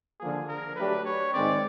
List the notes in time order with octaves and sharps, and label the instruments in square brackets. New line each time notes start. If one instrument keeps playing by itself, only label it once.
[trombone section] D3 F3 A#3 [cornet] G#4
[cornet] A#4
[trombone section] F#3 A3 D4 G4 [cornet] B4
[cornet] C#5
[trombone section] G#2 D#3 G#3 C4 [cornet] D5